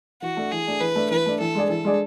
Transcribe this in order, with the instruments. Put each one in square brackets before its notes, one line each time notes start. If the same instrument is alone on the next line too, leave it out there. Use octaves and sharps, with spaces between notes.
[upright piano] E3 [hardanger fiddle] F#4
[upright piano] A3 D4
[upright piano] E3 [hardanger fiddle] G#4
[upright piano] A3 D4
[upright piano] E3 [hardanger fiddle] B4
[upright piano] A3 D4
[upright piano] E3 [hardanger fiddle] B4
[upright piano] A3 D4
[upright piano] E3 [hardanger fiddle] A4
[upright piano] G#3 D4 G#4 D5
[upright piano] E3 [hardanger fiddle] A4
[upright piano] G#3 D4 G#4 D5